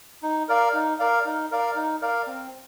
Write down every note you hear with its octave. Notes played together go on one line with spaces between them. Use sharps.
D#4
A#4 D5 F5
D#4
A#4 D5 F5
D#4
A#4 D5 F5
D#4
A#4 D5 F5
C4